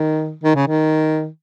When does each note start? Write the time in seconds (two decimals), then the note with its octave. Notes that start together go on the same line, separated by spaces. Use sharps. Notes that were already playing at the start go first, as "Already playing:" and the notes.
Already playing: D#3
0.43 D#3
0.55 C#3
0.67 D#3